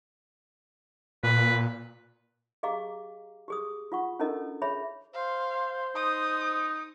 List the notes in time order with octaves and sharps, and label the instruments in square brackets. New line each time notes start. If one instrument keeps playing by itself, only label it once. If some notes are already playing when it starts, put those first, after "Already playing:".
[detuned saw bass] A#2 [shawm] B4
[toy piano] G4 G#4 D#5 F5 A#5 D6
G4 G#4 D#6
F4 F#5 C#6
C#4 D4 E4 A4 A#4 D#5
G#4 C#5 E5 B5
[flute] C5 [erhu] F5
[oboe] D#4 [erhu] D#6